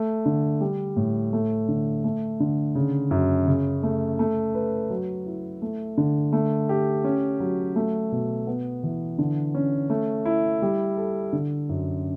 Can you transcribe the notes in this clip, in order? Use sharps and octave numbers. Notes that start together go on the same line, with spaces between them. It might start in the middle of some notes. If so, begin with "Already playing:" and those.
Already playing: A3
D3
G3
A2
A3
D3
A3
D3
C#3
F#2
C#3
A3
A3
B4
F#3
E4
A3
D3
A3
G4
C#4
F#3
A3
B2
B3
E3
D3
C#4
A3
E4
G3
A4
D3
F#2